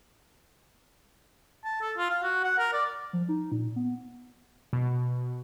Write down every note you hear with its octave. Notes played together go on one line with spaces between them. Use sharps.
A5
A4
F4
F5
F#4
F#5
A#4
D5
F3
D#4
A#2
B3
B2